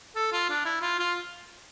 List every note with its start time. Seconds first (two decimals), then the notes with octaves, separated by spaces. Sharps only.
0.16 A4
0.32 F4
0.50 D4
0.65 E4
0.81 F4
0.99 F4